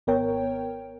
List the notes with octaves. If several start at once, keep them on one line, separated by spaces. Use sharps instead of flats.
G#1 B3 A#4 C#5 G5